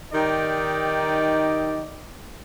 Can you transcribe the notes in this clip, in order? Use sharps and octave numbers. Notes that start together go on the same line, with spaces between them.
D#3 D#4 G4 D5 D#5